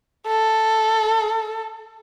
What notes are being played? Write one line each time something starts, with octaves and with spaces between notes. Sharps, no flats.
A4